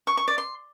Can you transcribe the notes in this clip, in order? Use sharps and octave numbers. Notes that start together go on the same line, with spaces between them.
C#6
C#6
D5
C6